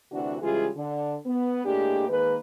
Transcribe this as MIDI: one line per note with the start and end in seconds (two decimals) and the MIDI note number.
0.12 0.37 38
0.12 0.37 48
0.12 0.37 52
0.12 0.37 62
0.12 0.37 66
0.42 0.67 49
0.42 0.67 52
0.42 0.67 55
0.42 0.67 56
0.42 0.67 65
0.42 0.67 68
0.76 1.15 50
1.25 1.62 59
1.66 2.08 45
1.66 2.08 56
1.66 2.08 58
1.66 2.08 62
1.66 2.08 67
2.09 2.35 51
2.09 2.35 56
2.09 2.35 58
2.09 2.35 71